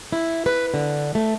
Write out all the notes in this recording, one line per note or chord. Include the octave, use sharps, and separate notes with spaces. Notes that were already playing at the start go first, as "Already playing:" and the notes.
E4
B4
D3
A3